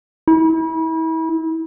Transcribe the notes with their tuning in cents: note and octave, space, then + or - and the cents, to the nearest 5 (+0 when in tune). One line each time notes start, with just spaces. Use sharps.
E4 -35